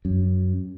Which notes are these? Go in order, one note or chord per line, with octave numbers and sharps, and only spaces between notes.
F#2